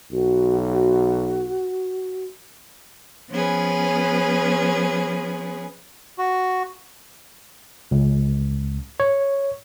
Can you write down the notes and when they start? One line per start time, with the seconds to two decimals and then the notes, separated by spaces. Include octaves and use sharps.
0.12 B1 F#4
3.30 F3 B3 C#4 G#4 B4
6.18 F#4
7.91 C#2
9.00 C#5